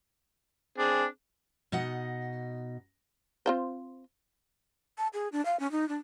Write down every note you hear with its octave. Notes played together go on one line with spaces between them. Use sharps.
C4 D4 G#4
B2 D#4 D#5 F#5
C4 F4 C5
A5
G#4
D4
F5
C#4
D#4
D4